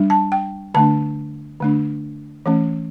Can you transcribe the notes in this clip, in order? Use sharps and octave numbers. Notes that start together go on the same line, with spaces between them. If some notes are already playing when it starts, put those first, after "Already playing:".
Already playing: G3 D4
A5
G5
D3 A3 D4 A5
D3 A3 D4
E3 A3 C#4